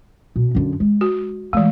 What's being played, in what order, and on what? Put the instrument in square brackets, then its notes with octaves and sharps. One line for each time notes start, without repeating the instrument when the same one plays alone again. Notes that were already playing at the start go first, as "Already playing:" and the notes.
[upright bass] B2
F#2 D3
G#3
[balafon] F#4
[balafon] E3 G#3 [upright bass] A3